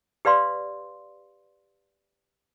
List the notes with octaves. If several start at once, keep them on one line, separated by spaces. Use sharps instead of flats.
G4 B4 D5 F5 C6